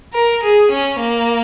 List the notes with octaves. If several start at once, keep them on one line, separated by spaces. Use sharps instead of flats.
A#4
G#4
C#4
A#3